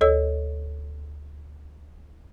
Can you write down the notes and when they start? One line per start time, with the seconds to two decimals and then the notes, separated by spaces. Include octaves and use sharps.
0.01 D2 A4 C#5 D#5 E6